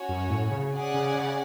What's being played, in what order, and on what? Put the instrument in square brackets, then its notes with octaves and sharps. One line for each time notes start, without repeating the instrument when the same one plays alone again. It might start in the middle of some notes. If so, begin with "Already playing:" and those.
Already playing: [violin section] C#4 F#4 C#5
[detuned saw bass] F#2
A2
C#3
[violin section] C#4 G#4 D5 F#5
[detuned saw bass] C#3
C#3